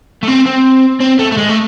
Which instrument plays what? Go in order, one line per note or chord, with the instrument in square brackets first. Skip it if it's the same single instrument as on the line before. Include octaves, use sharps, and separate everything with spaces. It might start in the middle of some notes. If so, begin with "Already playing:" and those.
[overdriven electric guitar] A3
C4
C4
C4
A3
A3
G#3
A3